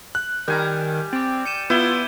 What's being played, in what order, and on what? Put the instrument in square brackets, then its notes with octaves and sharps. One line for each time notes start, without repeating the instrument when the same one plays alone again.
[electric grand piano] F#6
[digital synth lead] D#3 [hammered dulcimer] G3 G#5 A#5 [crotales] G6
[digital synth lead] C4 [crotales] D6 A6
[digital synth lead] G6 [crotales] C#7 D#7 E7
[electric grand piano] B3 [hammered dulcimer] E4 [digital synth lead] F4 [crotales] G6 E7 G7